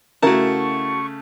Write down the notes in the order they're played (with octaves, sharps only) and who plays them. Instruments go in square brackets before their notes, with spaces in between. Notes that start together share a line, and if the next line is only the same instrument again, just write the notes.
[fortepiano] C#3 A3 [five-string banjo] E4 A#4 [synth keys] F#4 A5 [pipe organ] C#6